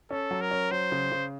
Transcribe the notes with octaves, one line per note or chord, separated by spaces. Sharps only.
C#4 A4
F#3
A#4
C#4
F#3 C5
C#3
C#3